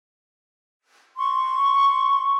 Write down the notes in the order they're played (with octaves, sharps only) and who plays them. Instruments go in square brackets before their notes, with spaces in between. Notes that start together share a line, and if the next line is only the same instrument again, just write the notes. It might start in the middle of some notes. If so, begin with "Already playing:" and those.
[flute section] C6 C#6